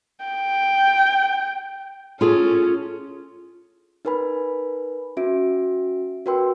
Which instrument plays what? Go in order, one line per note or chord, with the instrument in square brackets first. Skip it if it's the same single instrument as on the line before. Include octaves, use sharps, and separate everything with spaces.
[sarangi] G5
[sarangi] C#4 [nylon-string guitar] F4 G#4 A4
[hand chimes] D#4 A#4 B4 G#5 B5
C#4 F#4 E5 D7
F#4 A#4 B4 G5 C6 E6